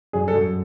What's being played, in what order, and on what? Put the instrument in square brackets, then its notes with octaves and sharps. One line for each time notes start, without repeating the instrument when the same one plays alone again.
[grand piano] F#2 G#4
A4
F#2